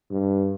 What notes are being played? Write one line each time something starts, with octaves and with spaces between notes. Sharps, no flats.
G2